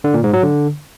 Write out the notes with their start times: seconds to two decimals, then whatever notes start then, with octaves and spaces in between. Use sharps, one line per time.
0.04 D3
0.14 A#2
0.24 G#2
0.33 F#3
0.43 D3